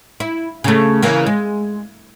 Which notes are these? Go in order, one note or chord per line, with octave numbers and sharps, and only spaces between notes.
E4
C#3 A3
C#3 E3 A#3
G#3